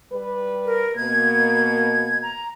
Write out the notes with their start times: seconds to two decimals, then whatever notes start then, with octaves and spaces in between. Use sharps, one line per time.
0.11 G3 B4
0.65 A#4
0.96 B2 A#3 G#6
2.22 A#5